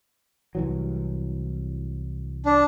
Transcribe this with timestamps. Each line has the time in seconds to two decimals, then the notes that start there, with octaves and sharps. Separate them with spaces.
0.55 C2 E3 F#3
2.46 D4